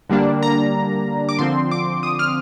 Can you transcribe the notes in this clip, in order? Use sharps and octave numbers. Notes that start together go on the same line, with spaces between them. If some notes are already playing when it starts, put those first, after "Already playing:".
D3 G3 A#3 D4
A#5
D6
D3 F3 C4 C6
D6
D#6
F6